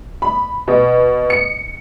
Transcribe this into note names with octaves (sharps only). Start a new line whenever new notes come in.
B5
B2
C#7